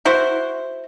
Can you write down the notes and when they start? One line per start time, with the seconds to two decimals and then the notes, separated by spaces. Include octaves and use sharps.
0.05 E4 F#4 C5